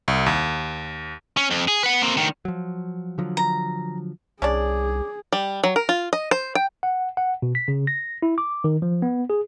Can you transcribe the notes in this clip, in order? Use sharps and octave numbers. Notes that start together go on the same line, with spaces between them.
C2
D#2
C#4
F2
G#4
B4 F#5
A#3 C4
D2 D#3
F3 F#3
D3 F3 F#3
A#5
C2 C#4 D4 G#4 D5
G3
F#3
A#4
F4
D#5
C5
G5
F#5
F#5
B2
B6
C#3
A#6
E4
D6
D#3
F3
B3
G#4